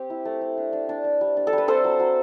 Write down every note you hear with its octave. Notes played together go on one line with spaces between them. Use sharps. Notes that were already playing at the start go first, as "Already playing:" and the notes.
Already playing: C4 G4
E4
A3
A3
D4
D4
D4
D4
G3
D4
A4
G3
B4
C4 A4 C5
F#3
F#3